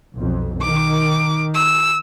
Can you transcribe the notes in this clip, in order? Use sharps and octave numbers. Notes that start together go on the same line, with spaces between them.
B1 F2
D#3 D6
E6